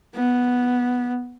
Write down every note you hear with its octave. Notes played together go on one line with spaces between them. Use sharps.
B3